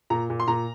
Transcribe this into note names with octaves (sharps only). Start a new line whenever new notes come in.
A#2 A#5
A#2
C6
A#2 A#5